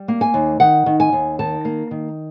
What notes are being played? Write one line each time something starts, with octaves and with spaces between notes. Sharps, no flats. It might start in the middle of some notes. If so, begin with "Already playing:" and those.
Already playing: G3
A#3
G#5
D#2
D#3 F#5
D#3
G#5
D#2
D#3 A5
A#3
D#3